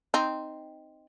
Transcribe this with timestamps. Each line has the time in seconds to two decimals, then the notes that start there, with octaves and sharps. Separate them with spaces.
0.14 C4 D#4